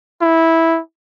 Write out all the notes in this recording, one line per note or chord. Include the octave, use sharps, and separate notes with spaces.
E4